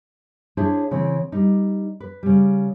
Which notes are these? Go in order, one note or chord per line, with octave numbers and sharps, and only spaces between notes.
D4 E4 G#4 C5 C#5
C#3 E3 C4
G3 D#4
B4
C#3 G3